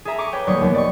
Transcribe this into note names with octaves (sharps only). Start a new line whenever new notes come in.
G#4 A4 E5 A#5
A#5 C#6 D6 C7 D7 D#7
B4 C#5 G5
D#1 F#3 G3 A#3 C#6 D#6
D#2 F#3 B3
D5 C#6